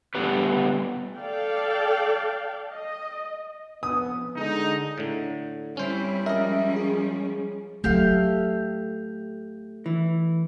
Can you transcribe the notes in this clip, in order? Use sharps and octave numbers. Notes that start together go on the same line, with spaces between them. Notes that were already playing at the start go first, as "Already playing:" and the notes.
G3 A3 B3 G4 B4
A4 D5 F5 G5
D#5
F2 B3 D#6
D3 G#3 D#4
A2 D3
G3 C4 C#4 E4 C5
F3 G#3 C#4 A#4 D#5 E5
G#4
F#3 A3 F4 G4 F5
E3